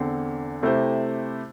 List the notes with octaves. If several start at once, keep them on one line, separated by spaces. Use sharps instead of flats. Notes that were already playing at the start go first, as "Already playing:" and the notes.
Already playing: E2 D3 C4
C3 A3 E4 G4 C5